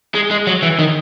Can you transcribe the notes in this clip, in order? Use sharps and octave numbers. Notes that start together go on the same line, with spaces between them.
G#3
G#3
F#3
E3
D#3